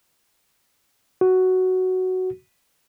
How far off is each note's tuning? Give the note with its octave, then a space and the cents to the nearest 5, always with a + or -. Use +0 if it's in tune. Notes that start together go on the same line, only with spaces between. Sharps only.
F#4 +5